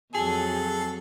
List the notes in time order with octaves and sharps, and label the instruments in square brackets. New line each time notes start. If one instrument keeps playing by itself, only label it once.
[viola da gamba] F2 F#3 [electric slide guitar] G#4 [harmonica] A4